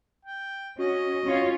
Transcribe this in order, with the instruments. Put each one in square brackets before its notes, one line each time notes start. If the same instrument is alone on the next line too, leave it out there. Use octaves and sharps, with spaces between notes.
[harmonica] G5
[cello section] C#4 [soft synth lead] F#4 [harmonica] D#5
[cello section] C#4 F4 C#5